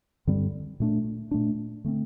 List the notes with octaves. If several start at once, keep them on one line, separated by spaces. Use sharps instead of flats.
G2 D3 G3 C4
A#2 A3 D4
A#2 A3 D4
D3 A3 C4